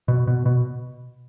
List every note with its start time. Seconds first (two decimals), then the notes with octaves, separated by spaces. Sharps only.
0.08 B2
0.27 B2
0.46 B2